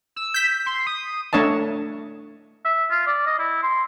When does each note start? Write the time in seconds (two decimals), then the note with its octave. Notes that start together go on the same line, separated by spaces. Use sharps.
0.16 E6
0.34 G6 B6
0.66 C6
0.87 D#6
1.33 A3 D4 C#5 D#5 A5
2.65 E5
2.91 F4
3.07 D5
3.27 D#5
3.39 E4
3.63 C6